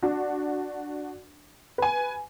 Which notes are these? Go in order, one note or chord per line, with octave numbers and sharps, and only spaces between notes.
D4 F#4
B4 G#5